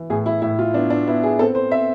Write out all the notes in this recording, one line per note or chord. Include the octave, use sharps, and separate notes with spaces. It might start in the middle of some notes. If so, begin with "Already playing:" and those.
Already playing: E3
A2 G#4
E4
A2 E4
F4
B3 D4
D4
B3 E4
G#4
C4 A4
C5
C4 E5